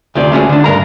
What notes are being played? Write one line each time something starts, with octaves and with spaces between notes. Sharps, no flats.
D2 C3 F4 D5
G#3 A3 C#4 F4 F#4 G#4
D3 D4
G2 A#4 A#5